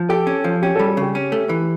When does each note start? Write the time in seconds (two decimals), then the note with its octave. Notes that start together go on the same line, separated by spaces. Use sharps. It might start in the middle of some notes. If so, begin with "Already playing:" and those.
Already playing: F3
0.09 G4 A4
0.27 C#4
0.44 F3
0.62 C#4 G4
0.75 A4
0.79 G3
0.88 A4
0.97 C#3 G4
1.15 C#4
1.32 A3
1.49 E3